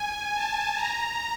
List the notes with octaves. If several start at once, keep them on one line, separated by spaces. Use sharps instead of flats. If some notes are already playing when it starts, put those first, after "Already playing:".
Already playing: G#5
A5
A#5